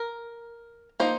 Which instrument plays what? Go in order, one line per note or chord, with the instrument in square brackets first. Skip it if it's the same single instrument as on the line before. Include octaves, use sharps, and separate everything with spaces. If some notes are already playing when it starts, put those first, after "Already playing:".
Already playing: [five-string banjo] A#4
F3 A#3 D#4 C5